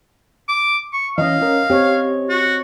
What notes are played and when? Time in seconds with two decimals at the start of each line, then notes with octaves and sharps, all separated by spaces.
0.48 D6
0.93 C#6
1.18 E3 C#4 D#5 F5
1.42 C#4 A#4
1.70 C4 G4 C#5
2.29 F#4